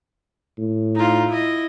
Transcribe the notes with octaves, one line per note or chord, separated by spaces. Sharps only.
A2
D#4 F4
E4 D#5